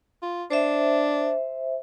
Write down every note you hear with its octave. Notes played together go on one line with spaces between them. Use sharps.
F4
D4 C5 E5